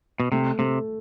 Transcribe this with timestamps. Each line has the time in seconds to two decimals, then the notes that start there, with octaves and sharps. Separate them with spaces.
0.20 B2
0.32 C3 A3
0.59 C3 A3